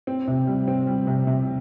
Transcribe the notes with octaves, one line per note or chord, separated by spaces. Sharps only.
C4
C3
G3
C4
G3
C3
C3